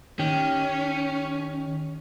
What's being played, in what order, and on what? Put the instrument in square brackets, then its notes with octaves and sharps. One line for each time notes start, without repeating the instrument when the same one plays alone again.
[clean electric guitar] D#3 G4 [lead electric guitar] C#4